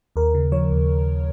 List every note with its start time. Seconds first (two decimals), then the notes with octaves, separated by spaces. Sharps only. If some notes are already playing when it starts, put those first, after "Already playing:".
0.16 D#2 A#4
0.34 C#3
0.52 F3 C#5
0.71 D#2